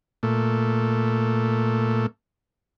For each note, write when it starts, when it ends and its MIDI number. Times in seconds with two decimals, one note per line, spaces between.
0.23 2.06 46
0.23 2.06 57